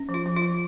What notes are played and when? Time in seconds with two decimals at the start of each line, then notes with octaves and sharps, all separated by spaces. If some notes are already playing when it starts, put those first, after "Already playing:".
Already playing: C#4
0.09 F3
0.14 F4
0.26 F3
0.36 F4
0.42 F3